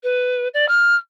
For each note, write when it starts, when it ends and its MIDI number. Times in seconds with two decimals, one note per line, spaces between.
0.03 0.48 71
0.54 0.66 74
0.68 0.95 89